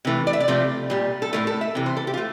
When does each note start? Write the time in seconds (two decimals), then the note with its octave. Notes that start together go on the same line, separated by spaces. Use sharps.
0.05 C3 E3 A3
0.27 D5
0.33 E5
0.40 D5
0.48 C3 F3 A3
0.90 A#2 G3
1.22 A4
1.33 A2 E3 A3 A#4
1.47 A4
1.61 E5
1.75 C3 E3
1.86 C5
1.97 A4
2.07 G4
2.14 F4
2.17 A3